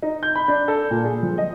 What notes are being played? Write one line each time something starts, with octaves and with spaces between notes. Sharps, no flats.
D#4
G6
B5
D4
A4
A#2
G#4
F3
D#5